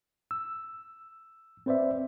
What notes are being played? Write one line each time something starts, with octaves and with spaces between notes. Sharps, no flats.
E6
C4 B4 C5 D5 E5